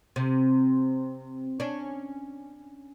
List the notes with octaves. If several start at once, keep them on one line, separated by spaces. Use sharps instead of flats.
C3
C#4 D4